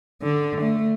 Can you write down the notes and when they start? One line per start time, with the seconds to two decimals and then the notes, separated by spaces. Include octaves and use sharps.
0.22 D3
0.61 A3